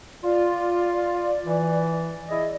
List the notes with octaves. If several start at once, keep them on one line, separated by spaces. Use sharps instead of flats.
F4 D5
E3
E4 G#4 D#5